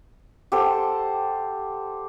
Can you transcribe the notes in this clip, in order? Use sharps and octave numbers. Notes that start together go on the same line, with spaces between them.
G4 A4 C5 F#5